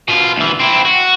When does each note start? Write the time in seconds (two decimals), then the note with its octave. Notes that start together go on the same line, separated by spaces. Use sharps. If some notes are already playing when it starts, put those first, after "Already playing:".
0.08 B2 F4
0.36 D2 E3
0.59 C4 E4
0.85 F#4